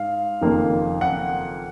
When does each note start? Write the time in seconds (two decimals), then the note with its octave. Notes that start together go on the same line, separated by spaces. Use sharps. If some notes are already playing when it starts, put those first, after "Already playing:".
Already playing: G#2 F5
0.41 F#1 F2 D#3 A#3
1.01 F#5